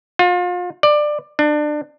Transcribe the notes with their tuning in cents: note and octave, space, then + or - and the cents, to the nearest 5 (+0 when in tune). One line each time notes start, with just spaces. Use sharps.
F4 +35
D5 +20
D4 +25